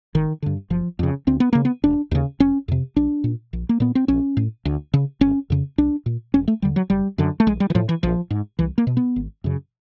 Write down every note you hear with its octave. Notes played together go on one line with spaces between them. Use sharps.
G#1 D#3
G2 D3
F#1 F3
F2 C#3
D2 C4
B3
C#3 A#3
B3
E1 D4
D#2 C#3
F1 C#4
F2 C3
B1 D4
A#2
A#1
A#3
A#2 B3
C4
A#1 C#4
A2
D2
C#3
G1 C#4
F2 C#3
C2 D4
A#2
E1 C#4
A3
D#2 D3 G3
F#3
F#1 G3
F#2 D3
A3
A#1 G#3
G3
E3
A2 F3
E3
A#1 F3
G#2
C2 E3
A#3
B2
B3
G#1
F#2 C#3